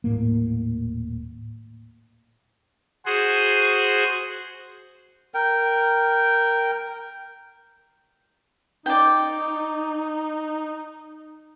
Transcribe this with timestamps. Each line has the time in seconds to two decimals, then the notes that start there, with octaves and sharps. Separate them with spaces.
0.04 D#1 A2 A#3
3.06 F#4 G#4 C5
5.34 A#4 G5
8.86 D#4 D5 G5